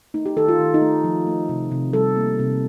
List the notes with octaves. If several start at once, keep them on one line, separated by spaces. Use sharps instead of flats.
A3 D#4
G4
D#3 A4
F4
D#3
D#4
A3
F3
A3
C3
C3
G3 A4
A#3
C3